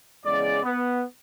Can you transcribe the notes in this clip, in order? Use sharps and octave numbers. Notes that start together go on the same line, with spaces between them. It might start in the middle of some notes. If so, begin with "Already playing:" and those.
E2 C#3 G#3 D5
B3